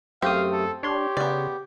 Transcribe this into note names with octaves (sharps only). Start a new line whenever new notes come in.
F#2 A3 C4 G4 F5 D#6
A4
D4 G4 C#5 C6
C#3 B3 D5